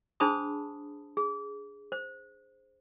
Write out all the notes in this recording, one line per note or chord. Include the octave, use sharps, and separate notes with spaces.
D4 G#4 C5 A5 B5 D#6
G#4
C5